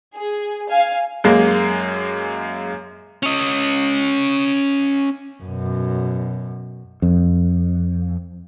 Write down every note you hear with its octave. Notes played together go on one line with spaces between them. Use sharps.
G#4
F5 G#5
F#2 G#3 A#3
C#4 D#5
F#2 B2
F2